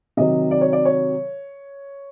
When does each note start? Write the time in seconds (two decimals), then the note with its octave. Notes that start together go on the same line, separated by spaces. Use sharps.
0.17 C3 D#3 F#3 D#5
0.51 D5
0.61 C#5
0.73 D5
0.85 C#5